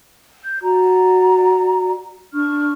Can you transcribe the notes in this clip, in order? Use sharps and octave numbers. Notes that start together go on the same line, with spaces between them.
G6
F#4 D5 A#5
D4 C#6 F6